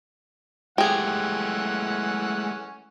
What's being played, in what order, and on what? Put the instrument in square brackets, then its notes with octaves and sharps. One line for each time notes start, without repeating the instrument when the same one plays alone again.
[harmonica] E3 C#4 F#5 [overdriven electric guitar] G#3 A3 [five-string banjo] G4 G#4